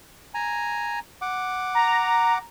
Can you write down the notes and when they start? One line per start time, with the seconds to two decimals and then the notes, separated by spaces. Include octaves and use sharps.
0.34 G#5 A#5
1.22 F#5 D6
1.75 A#5